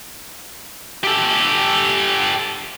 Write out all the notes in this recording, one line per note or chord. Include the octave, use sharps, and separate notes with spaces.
G4 A4